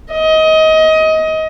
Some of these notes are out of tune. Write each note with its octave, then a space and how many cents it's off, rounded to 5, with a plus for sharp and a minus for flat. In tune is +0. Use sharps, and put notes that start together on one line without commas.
D#5 +25